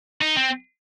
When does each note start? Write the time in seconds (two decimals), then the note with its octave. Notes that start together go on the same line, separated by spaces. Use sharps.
0.22 D#4
0.37 C4